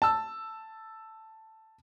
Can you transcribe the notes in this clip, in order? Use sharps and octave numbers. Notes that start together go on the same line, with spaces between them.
A5 E6